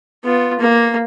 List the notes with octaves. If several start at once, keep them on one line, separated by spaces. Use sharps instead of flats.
B3 F4
A#3